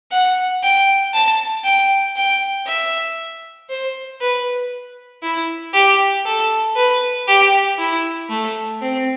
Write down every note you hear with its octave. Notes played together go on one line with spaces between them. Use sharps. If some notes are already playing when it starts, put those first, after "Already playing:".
F#5
G5
A5
G5
G5
E5
C5
B4
E4
G4
A4
B4
G4
E4
A3
C4